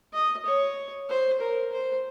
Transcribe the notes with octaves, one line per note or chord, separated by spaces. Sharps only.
D#5
C#5
C5
A#4
C5